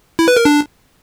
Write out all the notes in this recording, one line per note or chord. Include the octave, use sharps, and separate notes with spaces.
E4
B4
A#4
D4